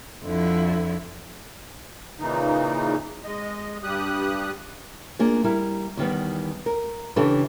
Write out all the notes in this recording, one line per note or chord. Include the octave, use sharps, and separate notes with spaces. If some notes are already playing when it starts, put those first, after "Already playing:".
F2 D3 E4
A#2 C#3 E3 D#4
G#3 D#5
G2 G3 G4 D#6 F#6
A#3 D4 F4 G#4
G3 E4 A#4
E2 D#3 G3 B3
A#4
C#3 E3 D4 G4 A4 B4